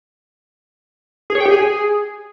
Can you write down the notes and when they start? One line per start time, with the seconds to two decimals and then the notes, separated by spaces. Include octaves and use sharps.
1.30 G#4
1.35 C#5
1.40 G5
1.46 G4
1.51 G#4